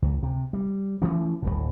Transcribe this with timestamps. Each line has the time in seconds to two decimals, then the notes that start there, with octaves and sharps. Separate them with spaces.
0.02 C#2
0.23 C3
0.53 G3
1.02 E3 F3 A3 C#4
1.42 D1 G1 A2